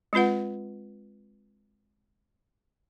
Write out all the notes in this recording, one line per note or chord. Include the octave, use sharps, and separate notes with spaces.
G#3 C4 F4 B4 F#5